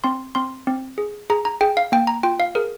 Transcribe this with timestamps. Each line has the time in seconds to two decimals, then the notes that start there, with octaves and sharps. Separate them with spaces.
0.04 C4 C6
0.35 C4 C6
0.67 C4
0.98 G#4
1.30 G#4 A#5
1.45 A#5
1.61 G#4 G5
1.77 F5
1.92 A#3 G5
2.07 A#5
2.23 F4 G5
2.40 F5
2.55 G#4 A#4